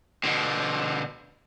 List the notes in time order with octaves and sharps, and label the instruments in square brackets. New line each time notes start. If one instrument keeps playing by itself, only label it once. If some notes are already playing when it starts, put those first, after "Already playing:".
[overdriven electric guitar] B2 D3